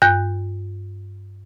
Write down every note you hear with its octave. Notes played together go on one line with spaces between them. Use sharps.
G2 F#6 G6